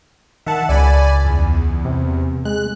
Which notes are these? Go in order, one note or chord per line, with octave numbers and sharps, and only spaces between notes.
D#3 E5 F#5 A5
C#2 D5 G#5 B5
E2
C3
G#3 F#6